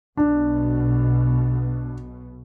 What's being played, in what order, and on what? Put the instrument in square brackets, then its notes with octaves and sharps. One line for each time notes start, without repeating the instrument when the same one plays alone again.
[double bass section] B1 B2 [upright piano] D4